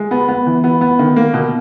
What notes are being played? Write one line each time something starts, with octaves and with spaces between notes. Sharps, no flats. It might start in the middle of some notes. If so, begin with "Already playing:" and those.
Already playing: G#3
B3
B3
E3
B3
B3
D#3
A#3
B2